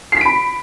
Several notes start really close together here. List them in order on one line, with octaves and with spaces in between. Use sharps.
C7 B6 D7 B5